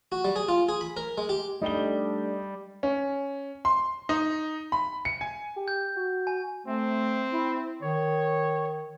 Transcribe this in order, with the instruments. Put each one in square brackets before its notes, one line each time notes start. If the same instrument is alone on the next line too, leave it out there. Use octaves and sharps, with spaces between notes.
[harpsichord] F#4
G3
G#4
F4
G#4
B5
A#4
G#3
G4
[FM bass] G3 [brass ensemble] A3 D4 [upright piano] D#4 G7
[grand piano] C#4
C6
D#4
B5
C#7
G#5
[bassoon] G4
[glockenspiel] G6
[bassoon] F#4
[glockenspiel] G#5
[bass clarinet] A3 [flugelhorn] C4
[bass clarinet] E4
[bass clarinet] D#3 [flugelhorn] C#5